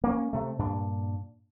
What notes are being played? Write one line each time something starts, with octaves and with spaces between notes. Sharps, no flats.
A#3 C#4
C3 A3
G2 A#2 D4